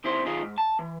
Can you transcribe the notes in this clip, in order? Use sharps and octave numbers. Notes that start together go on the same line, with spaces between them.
D#3 C4 E4 C5
B1 D#3 F4 G#4 D#5
G#2
A5
E3